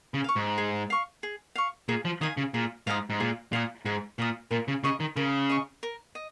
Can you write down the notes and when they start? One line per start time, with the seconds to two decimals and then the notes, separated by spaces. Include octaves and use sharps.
0.14 C#3
0.24 F5 C#6
0.36 G#2
0.58 G#4
0.90 F5 C#6
1.23 G#4
1.55 F5 C#6
1.89 A#2 G#4
2.05 F3
2.21 D#3 F5 G#5 D#6
2.37 C#3
2.54 A#2 G#4
2.87 G#2 F5 G#5 D#6
3.10 G#2
3.20 A#2 G#4
3.52 A#2 F5 G#5 D#6
3.85 G#2 G#4
4.18 A#2 F5 G#5 D#6
4.51 A#2 A#4
4.68 C#3
4.84 C#3 D#5 C#6
5.00 D#3
5.16 C#3 A#4
5.50 D#5 C#6
5.83 A#4
6.15 D#5